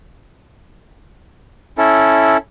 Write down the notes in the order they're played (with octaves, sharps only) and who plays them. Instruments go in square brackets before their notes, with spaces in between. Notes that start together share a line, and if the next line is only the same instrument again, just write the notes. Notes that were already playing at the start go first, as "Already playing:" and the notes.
[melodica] C#4 E4 A4